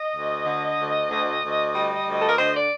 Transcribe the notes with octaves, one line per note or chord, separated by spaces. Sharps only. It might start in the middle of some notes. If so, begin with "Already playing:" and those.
Already playing: D#5
D2
D3
D2
D2
D2
G3
D2
A4
A#4
D3 C5
D5